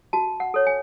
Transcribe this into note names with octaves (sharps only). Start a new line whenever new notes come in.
F#4 A5
F#5
A4 C#5
G#5